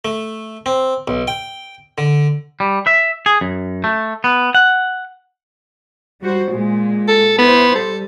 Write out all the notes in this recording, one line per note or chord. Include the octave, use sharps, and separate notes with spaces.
A3
C4
B1
G5
D3
G3
E5
G#4
F#2
A3
B3
F#5
G3 F#4 C5
A#2 G#3
A4
B3 E4 C5
G3 A4